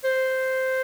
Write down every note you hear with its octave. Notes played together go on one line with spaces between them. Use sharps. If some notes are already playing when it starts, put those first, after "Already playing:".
C5